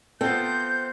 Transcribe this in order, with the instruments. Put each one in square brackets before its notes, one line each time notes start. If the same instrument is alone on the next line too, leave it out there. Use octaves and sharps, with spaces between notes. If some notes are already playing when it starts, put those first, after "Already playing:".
[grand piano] B3 F4 A4 [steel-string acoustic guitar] C4 [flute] G6